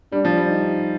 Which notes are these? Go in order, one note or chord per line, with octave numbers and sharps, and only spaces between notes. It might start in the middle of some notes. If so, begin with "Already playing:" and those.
G3 D4
F3
G3
D#4